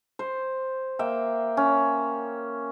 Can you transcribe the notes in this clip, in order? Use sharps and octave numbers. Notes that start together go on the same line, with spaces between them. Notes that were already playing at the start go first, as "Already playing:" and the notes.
C5
A#3 E5 G5
C#4